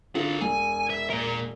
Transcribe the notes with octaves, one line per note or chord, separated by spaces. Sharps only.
D3 F4 G#4 A#4
E1 G#5
E5
A#2 A#4